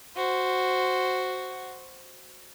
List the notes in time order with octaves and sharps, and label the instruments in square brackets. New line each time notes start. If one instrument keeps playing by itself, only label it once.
[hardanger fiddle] F#4 C5